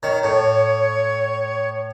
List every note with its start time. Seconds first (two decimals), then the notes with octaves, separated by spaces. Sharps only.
0.03 D#3 C#5
0.23 A2 C#5